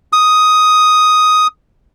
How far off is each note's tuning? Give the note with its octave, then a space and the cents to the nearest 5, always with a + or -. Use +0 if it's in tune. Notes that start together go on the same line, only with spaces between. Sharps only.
D#6 +5